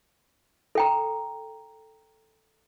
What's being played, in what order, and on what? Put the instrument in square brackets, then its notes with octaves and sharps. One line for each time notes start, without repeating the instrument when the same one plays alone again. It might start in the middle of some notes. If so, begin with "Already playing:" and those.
[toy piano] A4 G5 A#5